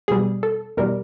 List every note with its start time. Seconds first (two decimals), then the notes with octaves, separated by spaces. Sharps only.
0.08 E2 B2 G3 G#4
0.43 A4
0.77 E2 B2 G3 A#4